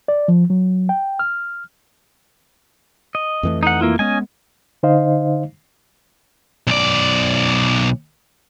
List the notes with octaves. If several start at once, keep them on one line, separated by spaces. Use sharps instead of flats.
D5
F3
F#3
G5
F6
D#5
F2 E3 A3
D#4 F#5
A#3 E4 F4
G#3 B3 C#4 D#5 G#5
D3 D#4 C5 D#5 F5
B1 D5